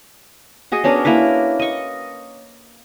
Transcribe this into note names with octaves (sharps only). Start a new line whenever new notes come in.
F#4 G#4 D#5
B3 C#4 D4 A#4
A#3 E4 A#4 B4
D#5 C#6